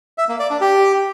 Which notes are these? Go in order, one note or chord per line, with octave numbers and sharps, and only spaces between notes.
E5
A#3
D5
D4
G4